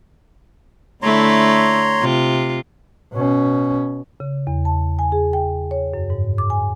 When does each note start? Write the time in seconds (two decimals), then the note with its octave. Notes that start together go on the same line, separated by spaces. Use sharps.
1.02 D3 A3 E4 C#5 A#5 C6
2.01 C3 F4
3.13 B2 C#4
4.20 C#3
4.47 E2
4.65 A5
4.99 G#5
5.12 G#4
5.33 G5
5.71 C#5
5.94 F#2
6.10 G#2
6.38 D6
6.50 G#5